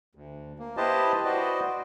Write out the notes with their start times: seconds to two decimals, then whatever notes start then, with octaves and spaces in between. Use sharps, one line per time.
0.15 D2
0.59 A#3
0.77 E4 G4 B4 C5 D#5 A5
1.25 F#4 B4 C5 D5 D#5